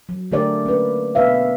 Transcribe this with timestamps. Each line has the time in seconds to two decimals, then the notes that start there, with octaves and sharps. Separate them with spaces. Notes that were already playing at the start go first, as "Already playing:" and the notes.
0.09 F#3
0.31 D3 A3 G4 A#4 D5
0.65 A#3 C#4 B4
1.15 B2 B4 E5 F5